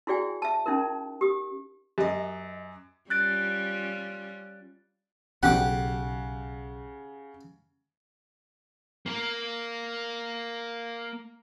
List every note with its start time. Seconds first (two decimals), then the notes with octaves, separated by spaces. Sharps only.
0.07 E4 F#4 G#4 D5 G5 G#5
0.42 E5 A5
0.66 C#4 D#4 E4 A#4
1.21 G4 D#6
1.98 F#2 G4 D#5
3.10 G3 C#4 F4 F#6 A6 D7
5.43 B1 C#3 G4 F#5 D6
9.06 A#3 A#4